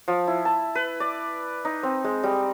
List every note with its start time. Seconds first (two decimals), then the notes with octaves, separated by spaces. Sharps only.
0.08 F3
0.27 E4
0.45 A5
0.75 B4
1.00 D5
1.65 D#4
1.83 C4
2.04 G#3
2.23 G3